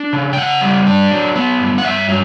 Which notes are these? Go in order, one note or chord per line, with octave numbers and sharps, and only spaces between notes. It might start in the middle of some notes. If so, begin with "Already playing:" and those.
Already playing: D4
C#3
G5
C#3 F#5
G3
D4
F#3
B3
G2
F#5
G2 E5
F#3